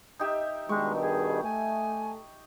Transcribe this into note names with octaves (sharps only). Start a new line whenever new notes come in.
D#4 G4 E5
G2 B2 D#3 G#3 C#6
G#4
A3 G#5